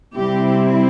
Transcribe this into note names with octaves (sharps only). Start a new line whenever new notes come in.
C3 G3 C4 E4 G4